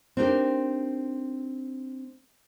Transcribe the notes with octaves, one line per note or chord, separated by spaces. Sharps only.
C4 D4 D#4 G4 A#4